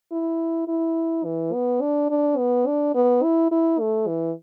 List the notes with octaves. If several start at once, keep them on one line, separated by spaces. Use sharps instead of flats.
E4
E4
E3
B3
D4
D4
B3
D4
B3
E4
E4
A3
E3